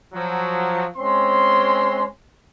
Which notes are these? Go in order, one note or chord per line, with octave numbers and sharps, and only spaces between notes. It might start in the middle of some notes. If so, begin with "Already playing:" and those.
F3 F#3
G#3 C4 C#4 C6